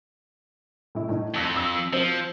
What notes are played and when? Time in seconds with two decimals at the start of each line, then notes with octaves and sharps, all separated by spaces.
0.95 A2 E4
1.09 A2 D#4
1.34 F2 A5 E6 A#6
1.55 D#6 E6 A#6
1.93 F3 C4 F#4 C5